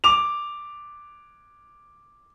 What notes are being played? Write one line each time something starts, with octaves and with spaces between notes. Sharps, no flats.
D6 F7